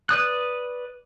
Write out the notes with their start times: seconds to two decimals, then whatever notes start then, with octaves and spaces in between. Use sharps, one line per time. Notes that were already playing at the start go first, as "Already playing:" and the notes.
0.09 B4 D5 D#6 F#6